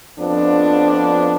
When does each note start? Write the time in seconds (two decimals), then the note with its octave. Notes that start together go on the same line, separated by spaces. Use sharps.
0.18 F2 F3 B3 D4